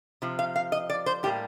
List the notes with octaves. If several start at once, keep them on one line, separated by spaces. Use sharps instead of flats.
C3 F3
F5
F5
D#5
D5
C5
A2 G3 A#3 G4